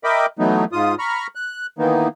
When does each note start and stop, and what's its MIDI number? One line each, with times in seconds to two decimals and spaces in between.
0.04 0.26 70
0.04 0.26 75
0.04 0.26 76
0.04 0.26 79
0.04 0.26 83
0.04 0.26 86
0.39 0.65 52
0.39 0.65 54
0.39 0.65 57
0.39 0.65 59
0.39 0.65 63
0.72 0.95 44
0.72 0.95 65
0.72 0.95 87
0.99 1.27 82
0.99 1.27 83
0.99 1.27 85
0.99 1.27 89
1.35 1.67 90
1.79 2.08 51
1.79 2.08 52
1.79 2.08 58
1.79 2.08 59
1.79 2.08 63